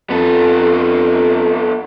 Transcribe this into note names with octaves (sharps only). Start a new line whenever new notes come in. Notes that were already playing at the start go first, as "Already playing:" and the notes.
F2 B3 A4